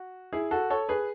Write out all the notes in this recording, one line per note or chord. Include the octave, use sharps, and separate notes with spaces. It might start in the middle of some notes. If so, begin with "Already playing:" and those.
Already playing: F#4
E4 G#4
F#4 A4
A4 C#5
G#4 B4